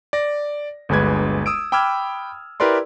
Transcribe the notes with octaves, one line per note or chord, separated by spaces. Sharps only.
D5 A#6
G1 D2 G#3 B4 G#6
D#6 E6 D7
G5 B5 D6 E6 F6 G#6
E4 G4 A#4 B4 D5 C6